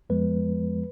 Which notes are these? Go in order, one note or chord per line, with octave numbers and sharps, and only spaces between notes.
F2 F3 G#3 B3 B4